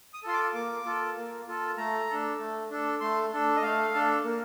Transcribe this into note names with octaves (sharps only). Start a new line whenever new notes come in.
D#6
F4 A4 C6
D6
A#3 D6
F4 A4
A#3
F4 A4
A3 A#5
D4 A4
A3
D4 A4
A3 C6
D4 A4
D#5
A3 F5
D4 A4
A#3